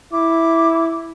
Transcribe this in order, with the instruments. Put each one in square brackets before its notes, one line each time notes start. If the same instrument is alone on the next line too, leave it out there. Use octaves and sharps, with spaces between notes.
[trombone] E4 [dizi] D6